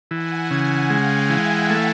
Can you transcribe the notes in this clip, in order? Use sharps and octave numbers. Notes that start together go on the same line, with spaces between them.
E3 F#5 G#5
C#3
G#3 F5 G5
E3 E5 F#5
A3